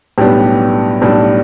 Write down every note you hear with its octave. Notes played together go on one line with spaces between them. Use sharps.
B1 A2 G3 B3 D4 G4
G4
B1 A2 G3 B3 D4